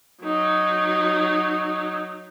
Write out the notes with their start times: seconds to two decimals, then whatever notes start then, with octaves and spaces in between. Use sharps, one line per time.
0.23 F#3 D#4